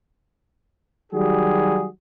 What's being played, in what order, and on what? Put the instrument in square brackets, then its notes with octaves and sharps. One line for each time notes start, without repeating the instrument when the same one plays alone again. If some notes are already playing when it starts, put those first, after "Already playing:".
[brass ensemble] D#3 F#3 G3 F#4 G#4